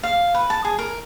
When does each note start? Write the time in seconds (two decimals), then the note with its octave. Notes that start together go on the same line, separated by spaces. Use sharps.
0.03 F5
0.35 B4
0.50 A5
0.65 G#4
0.79 A#4